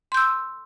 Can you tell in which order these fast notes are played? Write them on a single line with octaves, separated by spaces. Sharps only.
C6 G6 E6